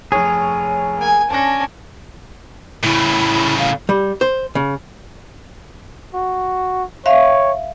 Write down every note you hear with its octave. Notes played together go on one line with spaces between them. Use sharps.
F1 G#4 C#5
A#3 G#5
C#4 D4 A5 A#6
A2 C#3 E4
F5
G3
C5
C#3
F#4
C#5 E5 F5